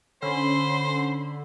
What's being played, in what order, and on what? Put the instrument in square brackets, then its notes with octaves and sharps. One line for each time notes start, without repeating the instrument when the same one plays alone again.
[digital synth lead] D3 [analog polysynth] C#4 [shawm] C5 [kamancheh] B5 C6